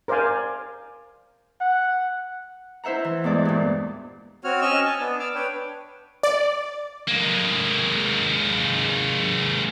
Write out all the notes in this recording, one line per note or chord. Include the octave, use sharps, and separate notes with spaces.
A#4 C5 D5 F5 G#5
F#5
E4 C5 E5 F#5 A#5
E3
E2 G2 G#3 D5
G2 A#2
C4 F#4 C#5 F6
C#4 D#5 C#6 E6 F6
G#5 A5
B3 D4
D6 E6 F6
D4 B4 C#5 G5
D5
G#3 A#3